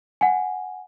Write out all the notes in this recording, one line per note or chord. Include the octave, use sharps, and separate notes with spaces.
F#5 G#5